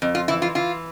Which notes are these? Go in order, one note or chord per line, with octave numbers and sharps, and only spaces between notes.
F2
F4
E3 E4
F4
E3 F4